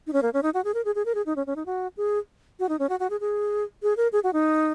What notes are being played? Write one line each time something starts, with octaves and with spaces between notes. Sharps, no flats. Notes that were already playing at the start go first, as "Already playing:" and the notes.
D#4
C#4
A#3
C#4
D#4
F#4
G#4
A#4
G#4
G#4
A#4
G#4
D#4
C#4
C#4
D#4
F#4
G#4
F#4
D#4
C#4
F#4
F#4
G#4
G#4
G#4
A#4
G#4
F#4
D#4